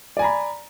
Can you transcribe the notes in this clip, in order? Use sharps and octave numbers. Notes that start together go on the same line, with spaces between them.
D5 G#5 A#5 B5